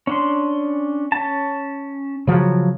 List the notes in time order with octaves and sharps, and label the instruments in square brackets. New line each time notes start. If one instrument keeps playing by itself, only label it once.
[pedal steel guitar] C#4 D4 C6
C#4 A5
[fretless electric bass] C#3 F3 F#3